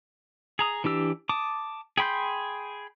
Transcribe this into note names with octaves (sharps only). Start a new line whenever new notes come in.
G#4 A#5 D#6
E3 D4 G4 E6
A5 D6 D#6
G#4 G5 B5 C6 G6